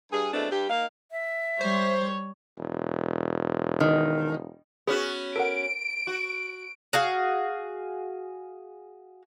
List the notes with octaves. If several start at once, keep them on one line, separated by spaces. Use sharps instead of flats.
G2 G#4
E2 B2 G#3 A3 C4 D4
G2 G4
A#3 D#4 F5
E5
G3 C5 C#5
E1
D#3
B3 C#4 F#4 G#4
A4 A#4 F#5 D7
F#4
F#4 G#4 F5